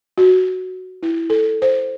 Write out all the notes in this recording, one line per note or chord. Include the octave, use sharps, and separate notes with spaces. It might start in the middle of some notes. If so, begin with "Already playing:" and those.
F#4
E4
A4
C5